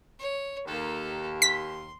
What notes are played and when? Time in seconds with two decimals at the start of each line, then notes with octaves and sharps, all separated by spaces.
0.19 C#5
0.67 D#2 A#3 A4
1.42 C6 B6